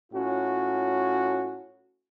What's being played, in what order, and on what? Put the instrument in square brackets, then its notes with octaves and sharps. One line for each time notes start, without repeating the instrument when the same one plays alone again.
[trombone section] A2 C#4 F4 F#4